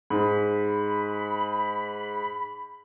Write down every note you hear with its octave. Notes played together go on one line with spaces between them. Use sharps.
G#2 B5